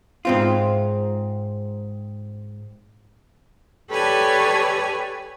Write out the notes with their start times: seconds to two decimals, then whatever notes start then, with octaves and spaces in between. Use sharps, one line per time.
0.25 G#2 C4 F4
3.89 G4 A4 B4 C#5 D5 G#5